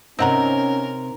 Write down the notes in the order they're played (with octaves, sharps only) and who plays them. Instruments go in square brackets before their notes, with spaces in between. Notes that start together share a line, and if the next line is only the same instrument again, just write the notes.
[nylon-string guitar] C3 D#4 [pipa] C4 F#5 A#5 [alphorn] C#4 [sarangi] A#4